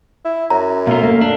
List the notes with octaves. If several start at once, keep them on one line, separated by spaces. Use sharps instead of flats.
E4
F#2 A#5
B2 A3 F4 E5 F5
A3 A#3
A3 D4